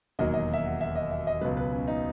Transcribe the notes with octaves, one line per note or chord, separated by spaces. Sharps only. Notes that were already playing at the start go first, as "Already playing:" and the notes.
E1 D#2 D#3 F#3 D#5
D#5
E5
F#5
E5
D#5
E5
D#5
C#2 B2 F#3 B4
B4
C#4
D#4